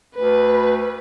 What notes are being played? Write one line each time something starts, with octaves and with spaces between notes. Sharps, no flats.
D2 B4